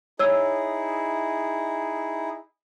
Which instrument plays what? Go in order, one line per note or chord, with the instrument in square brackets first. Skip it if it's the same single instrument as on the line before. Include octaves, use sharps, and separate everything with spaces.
[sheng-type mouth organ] D#4 E4 G#4 [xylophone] C#5 E6